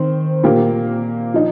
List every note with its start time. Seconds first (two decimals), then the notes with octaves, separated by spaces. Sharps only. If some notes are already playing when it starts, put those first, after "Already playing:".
Already playing: D#3 C4 C5
0.44 A#2 A#3 G4
1.34 F3 D#4